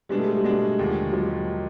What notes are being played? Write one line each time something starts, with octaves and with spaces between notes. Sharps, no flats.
B2 G3 G#3 B3 D4 F#4
A3
G#3
G3
B2 G#3 B3 D4 F#4
D#2 D3 F3 G#3
F3 F#3 G#3